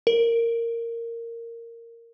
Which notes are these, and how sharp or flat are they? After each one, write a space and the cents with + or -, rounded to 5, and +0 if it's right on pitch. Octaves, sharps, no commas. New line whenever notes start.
A#4 -10